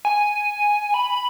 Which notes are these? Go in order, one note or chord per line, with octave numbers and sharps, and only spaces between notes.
G#5
B5